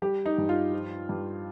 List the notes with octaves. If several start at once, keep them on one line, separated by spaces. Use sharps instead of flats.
G3 G4
D#4
G2
F4
F3
G2